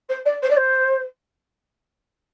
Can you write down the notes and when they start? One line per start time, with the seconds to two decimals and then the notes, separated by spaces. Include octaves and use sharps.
0.09 C5
0.25 D5
0.43 C5
0.50 D5
0.57 C5